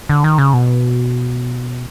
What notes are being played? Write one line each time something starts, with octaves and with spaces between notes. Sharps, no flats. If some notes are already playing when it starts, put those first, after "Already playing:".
D3
D#3
C#3
B2